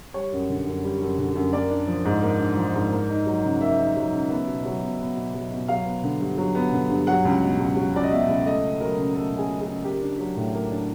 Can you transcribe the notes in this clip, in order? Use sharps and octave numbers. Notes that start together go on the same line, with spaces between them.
G3 C#5
F#2
D3
F#2
G3
F#2
D3
F#2
A#3 D5
D4
F3
G#2
A#3
D4
F3
G#2
A#3
D#4
F#3
C#3
A#3 E5
D#4
F#3
C#3
B3
B2
F#3
B2
B3
B2
F#3
B2
F#3 F5
B3
D3
G2
F#3
B3
D3
G2
F#3 F#5
C#2
B2
C#2
F#3
C#2 D5
D#5
B2 E5
C#2
A3 D#5
C#3
F#3 A#4
C#3
A3 A4
C#3
G#4
F#3
G#4
C#3
A#3 G4
D4
F#3
A2
A#3
D4